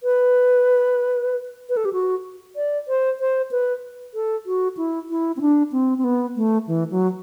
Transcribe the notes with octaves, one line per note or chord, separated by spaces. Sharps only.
B4
B4
A4
G4
F#4
D5
C5
C5
B4
A4
F#4
E4
E4
C4
D4
C4
C4
B3
A3
E3
F#3